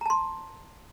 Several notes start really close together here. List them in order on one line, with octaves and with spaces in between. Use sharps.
A#5 A5 C6